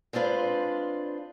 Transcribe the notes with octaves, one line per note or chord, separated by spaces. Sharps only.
G#3 C4 D4 F4 B4